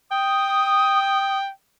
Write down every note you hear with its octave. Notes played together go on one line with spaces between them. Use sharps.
G5 D#6